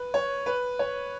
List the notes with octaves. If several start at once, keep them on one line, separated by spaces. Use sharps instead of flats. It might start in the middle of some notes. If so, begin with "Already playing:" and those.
Already playing: B4
C#5
B4
C#5